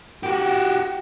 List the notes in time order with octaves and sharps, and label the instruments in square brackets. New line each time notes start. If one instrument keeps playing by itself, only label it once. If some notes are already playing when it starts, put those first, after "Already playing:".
[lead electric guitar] F#4 G4